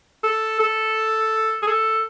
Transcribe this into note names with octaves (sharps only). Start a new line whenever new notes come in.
A4
A4
G#4
A4